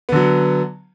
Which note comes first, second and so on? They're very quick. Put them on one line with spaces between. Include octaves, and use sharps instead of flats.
B3 D3 F#3